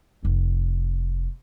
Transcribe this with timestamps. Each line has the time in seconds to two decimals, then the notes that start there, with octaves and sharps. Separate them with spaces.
0.23 F1 C4